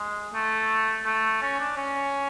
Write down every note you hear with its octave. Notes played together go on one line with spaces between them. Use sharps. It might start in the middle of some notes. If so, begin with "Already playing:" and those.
Already playing: G#3
A3
A3
C#4
D4
C#4